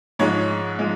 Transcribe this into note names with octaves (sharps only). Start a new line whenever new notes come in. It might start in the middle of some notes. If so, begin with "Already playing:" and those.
G#2 F3 G#3 C#5
F3 G#3